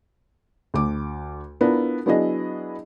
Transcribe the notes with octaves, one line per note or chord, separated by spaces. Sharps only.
D2 D6
B3 D4 E4 F4 A#4
F#3 B3 D4 E4 G#4 D#5